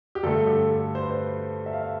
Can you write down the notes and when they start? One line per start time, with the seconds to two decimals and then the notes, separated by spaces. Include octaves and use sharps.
0.15 G4
0.23 G2 D3 A3 A4
0.47 G4
0.71 A4
0.95 C5
1.02 B4
1.11 C5
1.66 E5
1.73 F5
1.82 E5